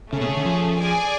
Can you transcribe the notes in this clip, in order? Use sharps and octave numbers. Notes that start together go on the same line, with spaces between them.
C#3 A3 C#4 G#4
B2
C#3
D3
F3
G#4 D5 G#5